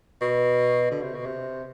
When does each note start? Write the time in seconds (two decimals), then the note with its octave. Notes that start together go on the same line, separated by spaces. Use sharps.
0.21 B2
0.91 D3
1.03 C3
1.15 B2
1.26 C3